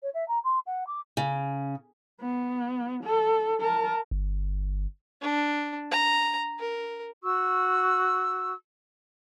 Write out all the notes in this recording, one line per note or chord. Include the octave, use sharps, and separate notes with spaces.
C#5
E5
A#5
C6
F#5
D6
C#3
B3
A4
A#4 A5
G1
D4
A#5
A#4
F#4 C#6 E6